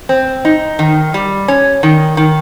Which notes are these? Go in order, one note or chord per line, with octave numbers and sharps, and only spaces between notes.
C4
D#4
D#3
G3
C#4
D#3
D#3